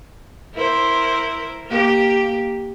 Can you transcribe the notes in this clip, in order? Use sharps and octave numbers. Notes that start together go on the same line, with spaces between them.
E4 A#4 C5
A#3 G4